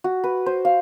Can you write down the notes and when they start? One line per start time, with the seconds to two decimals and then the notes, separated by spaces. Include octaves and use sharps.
0.04 F#4
0.24 B4
0.46 C5
0.65 F5